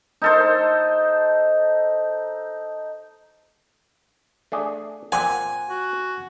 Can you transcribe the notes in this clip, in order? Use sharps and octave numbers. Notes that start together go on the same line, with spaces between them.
D#4 A4 C5
A3 D4 G#4
A#2 C4 F#5 G#5
F#4